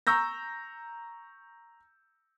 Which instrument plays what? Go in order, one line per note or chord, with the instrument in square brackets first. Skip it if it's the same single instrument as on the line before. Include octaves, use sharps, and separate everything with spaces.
[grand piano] A#5 C#6 E6 G6 A#6